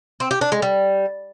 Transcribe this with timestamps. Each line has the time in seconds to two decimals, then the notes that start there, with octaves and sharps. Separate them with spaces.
0.20 C4
0.31 G4
0.41 D4
0.52 G#3
0.62 G3